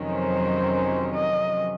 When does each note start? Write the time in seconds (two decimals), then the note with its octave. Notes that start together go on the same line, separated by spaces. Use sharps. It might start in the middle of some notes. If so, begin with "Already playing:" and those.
Already playing: F2 C3 D#3 F#3 C#4
0.13 C5
1.14 D#5